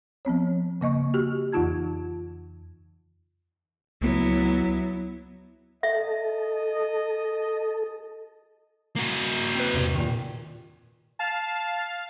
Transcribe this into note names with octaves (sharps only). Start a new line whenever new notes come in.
F3 B3 C4 C#5
C#3 A#3 D#5 C#6
F#4 G4
F2 E3 D#4 F4 A5 G#6
C#2 F#3 B3 E4
A4 D#5 E5
A#3 F#4
C4 B4
E2 G2 C3
A#2 D#3
F5 A5